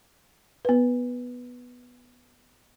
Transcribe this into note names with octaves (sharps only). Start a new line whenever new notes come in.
B3 B4